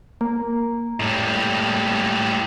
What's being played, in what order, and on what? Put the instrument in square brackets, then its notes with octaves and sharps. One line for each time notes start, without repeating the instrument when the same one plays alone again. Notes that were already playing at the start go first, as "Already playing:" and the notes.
[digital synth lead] A#3
[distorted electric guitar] A2 G3